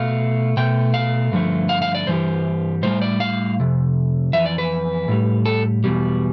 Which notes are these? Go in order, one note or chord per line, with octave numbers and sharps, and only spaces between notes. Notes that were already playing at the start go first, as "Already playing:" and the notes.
Already playing: B2 A3 F5
B2 A3 G5
F5
G2 D3 F3 A3
F5
F5
D5
G2 E3 G3 C5
A2 E3 G3 C5
D5
F5
F2 C3
F2 E3 E5
D5
B4
A2 G3
A4
E2 B2 G3